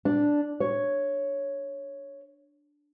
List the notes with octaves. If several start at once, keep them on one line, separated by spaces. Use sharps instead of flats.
D4
C#5